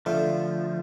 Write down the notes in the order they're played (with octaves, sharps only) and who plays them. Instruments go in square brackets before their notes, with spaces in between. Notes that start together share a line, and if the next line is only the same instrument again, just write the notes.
[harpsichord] D3 A3 [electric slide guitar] F3